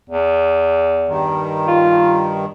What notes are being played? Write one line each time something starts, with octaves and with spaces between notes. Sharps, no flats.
E2
G2 D#3
F4